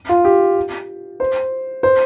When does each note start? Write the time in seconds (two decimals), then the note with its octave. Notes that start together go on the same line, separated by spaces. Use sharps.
0.09 F4
0.25 G4
1.20 C5
1.83 C5